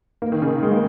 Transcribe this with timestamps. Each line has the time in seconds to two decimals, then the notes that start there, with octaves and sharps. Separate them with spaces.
0.22 A#3
0.32 D#3
0.42 C#3
0.63 G#3
0.71 A#3